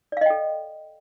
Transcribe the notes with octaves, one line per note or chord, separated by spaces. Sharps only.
A4 D5 D#5 F5 G5